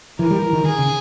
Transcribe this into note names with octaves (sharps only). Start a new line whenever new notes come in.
E3 A#4
G3
E3
D#3
D#3 G#4
C#3